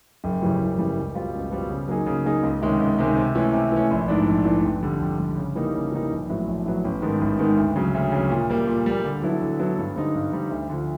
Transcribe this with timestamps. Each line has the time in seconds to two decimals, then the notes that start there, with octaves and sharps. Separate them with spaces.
0.24 F#1
0.42 F#2 C#3 E3 G3
0.60 F#1
0.78 F#2 C#3 E3 G3
0.97 C#2
1.14 B2 G3 C4 F4
1.34 C#2
1.52 B2 G3 C4 F4
1.70 C#3
1.88 F#3 A#3 D#4 G#4
2.06 C#3
2.25 F#3 A#3 D#4 G#4
2.43 C#2
2.62 C3 D#3 G#3 C#4
2.80 C#2
2.98 C3 D#3 G#3 C#4
3.17 C3
3.35 E3 A3 C#4
3.53 C3
3.72 E3 A3 C#4
3.91 A#1
4.08 G#2 E3 A3 D4
4.27 A#1
4.45 G#2 E3 A3 D4
4.64 F2
4.83 D3 G3
5.00 F2
5.18 D3 G3
5.37 C#3
5.55 E3 G3 A#3 D#4
5.74 C#3
5.92 E3 G3 A#3 D#4
6.10 A#1
6.29 A2 F#3 B3
6.48 A#1
6.66 A2 F#3 B3
6.84 A1
7.02 G#2 D#3 G#3 B3
7.21 A1
7.38 G#2 D#3 G#3 B3
7.57 D2
7.76 C#3 F#3
7.95 D2
8.12 C#3 F#3
8.30 A#2
8.50 G3 A#3
8.67 A#2
8.86 G3 A#3
9.05 D3
9.22 F#3 B3 E4 A4
9.41 D3
9.59 F#3 B3 E4 A4
9.78 G2
9.96 D3 G3 C4 D#4
10.14 G2
10.32 D3 G3 C4 D#4
10.51 D2
10.69 D3 F3